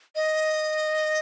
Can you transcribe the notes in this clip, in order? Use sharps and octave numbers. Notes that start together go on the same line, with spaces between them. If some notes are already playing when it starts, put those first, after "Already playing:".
D#5